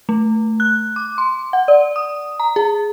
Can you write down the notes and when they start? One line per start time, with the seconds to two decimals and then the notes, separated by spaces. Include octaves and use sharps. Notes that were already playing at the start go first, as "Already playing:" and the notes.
0.09 A3
0.60 F#6
0.96 D6
1.18 C6
1.53 F#5
1.68 D5
1.96 D#6
2.40 A#5
2.56 G#4